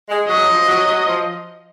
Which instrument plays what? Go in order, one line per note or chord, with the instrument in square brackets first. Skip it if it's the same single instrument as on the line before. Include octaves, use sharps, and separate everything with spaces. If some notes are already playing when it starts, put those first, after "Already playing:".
[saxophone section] G#3
[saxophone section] F#3 [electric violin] D#5
[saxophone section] F3
F#3
F#3
F3